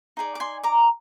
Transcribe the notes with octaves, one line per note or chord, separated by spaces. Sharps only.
D#4 G#4 D5
D6
G#5 C6
A#5 D6